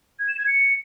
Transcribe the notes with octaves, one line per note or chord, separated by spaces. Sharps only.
G#6
E7
G#6
C#7